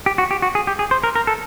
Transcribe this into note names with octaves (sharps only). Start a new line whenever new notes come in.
G4
F#4
G4
F#4
G#4
G4
G#4
C5
A#4
A#4
A4